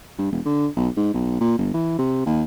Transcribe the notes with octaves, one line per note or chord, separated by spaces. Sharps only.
G2
E1
D3
B1
G#2
B1
A#2
G1
E3
C3
D#2